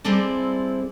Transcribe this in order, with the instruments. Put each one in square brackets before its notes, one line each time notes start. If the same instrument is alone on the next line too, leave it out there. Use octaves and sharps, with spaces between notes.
[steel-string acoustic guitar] G3 G#3 C4 E4 A4 D5